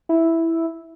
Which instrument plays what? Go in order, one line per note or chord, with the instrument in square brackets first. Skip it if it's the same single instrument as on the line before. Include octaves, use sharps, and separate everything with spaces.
[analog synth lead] E4